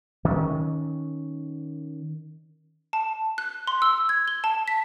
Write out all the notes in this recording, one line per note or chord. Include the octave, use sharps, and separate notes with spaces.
D#3 C#4
A5
F#6
C6
E6
G#6
G7
A5
B6